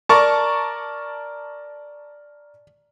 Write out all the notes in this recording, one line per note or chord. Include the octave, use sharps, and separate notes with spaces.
A#4 D5 A5 A#5 C#6